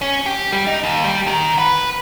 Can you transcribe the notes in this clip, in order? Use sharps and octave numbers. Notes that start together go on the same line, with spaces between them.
C#4
G4
G3
D#4
D#2
G3
D#3
B4